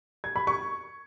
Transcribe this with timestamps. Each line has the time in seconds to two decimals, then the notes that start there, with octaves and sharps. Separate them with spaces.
0.24 G#6
0.36 B5
0.47 C#6